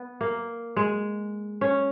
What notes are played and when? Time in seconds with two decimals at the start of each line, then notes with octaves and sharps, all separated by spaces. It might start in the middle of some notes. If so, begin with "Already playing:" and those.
Already playing: B3
0.21 A#3
0.76 G#3
1.61 C#4